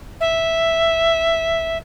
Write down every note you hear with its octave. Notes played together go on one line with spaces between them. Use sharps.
E5